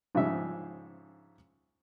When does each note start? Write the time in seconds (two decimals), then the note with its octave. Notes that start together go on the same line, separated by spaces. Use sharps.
0.15 G#2 C#3 F3 G3 E5